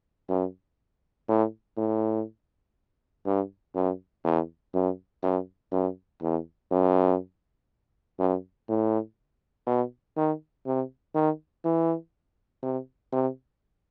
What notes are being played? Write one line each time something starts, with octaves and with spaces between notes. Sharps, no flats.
F#2
A2
A2
G2
F#2
E2
F#2
F#2
F#2
E2
F#2
F#2
A2
B2
D#3
C3
D#3
E3
C3
C3